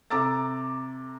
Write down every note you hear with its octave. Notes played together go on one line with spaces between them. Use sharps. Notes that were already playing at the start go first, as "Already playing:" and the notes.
C3 A4 A#5 D6 E6 A6